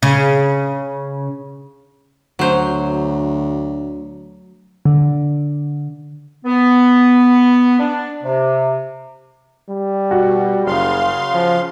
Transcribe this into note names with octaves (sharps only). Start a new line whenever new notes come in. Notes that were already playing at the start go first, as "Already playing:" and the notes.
C#3
D2 F#3 C5
D3
B3
D4
C3
G3
B2 F#4
F#1 C#3 F5 C6
F3